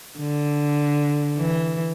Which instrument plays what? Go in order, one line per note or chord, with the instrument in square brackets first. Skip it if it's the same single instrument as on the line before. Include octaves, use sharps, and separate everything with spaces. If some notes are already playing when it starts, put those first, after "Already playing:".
[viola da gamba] D3
E3